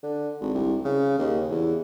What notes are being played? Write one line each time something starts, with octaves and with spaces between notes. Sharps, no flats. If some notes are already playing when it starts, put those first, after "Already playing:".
D3
G#1
C2
C#3
D#2
E2